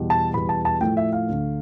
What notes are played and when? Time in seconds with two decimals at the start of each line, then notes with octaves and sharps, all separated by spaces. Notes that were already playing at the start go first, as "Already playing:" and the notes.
Already playing: E2 B2 G3
0.10 A5
0.34 E2 B2 G3 B5
0.49 A5
0.65 A5
0.81 A2 F3 A3 G5
0.97 E5
1.13 F5
1.28 D2 D3 A3